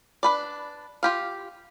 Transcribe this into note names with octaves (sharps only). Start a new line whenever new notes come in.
D4 B4 D5
F4 G4 F5